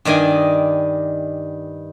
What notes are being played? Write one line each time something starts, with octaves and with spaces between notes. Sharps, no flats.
G2 D#3 D5 D#5 G#5